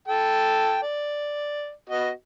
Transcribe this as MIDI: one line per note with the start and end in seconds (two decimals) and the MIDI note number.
0.08 0.79 69
0.08 0.79 79
0.08 0.79 81
0.83 1.71 74
1.90 2.10 59
1.90 2.10 66
1.90 2.10 75